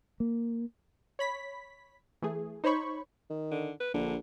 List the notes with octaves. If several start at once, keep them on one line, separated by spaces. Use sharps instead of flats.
A#3
C#5 B5 B6
E3 A3 G#4
D#4 C5 C#5 B5 C#6
D#3
D3
B4
A#1 D3